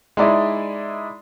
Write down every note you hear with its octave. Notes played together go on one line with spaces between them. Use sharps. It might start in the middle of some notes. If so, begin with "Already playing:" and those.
G#3 D#4 E4 D5 D#5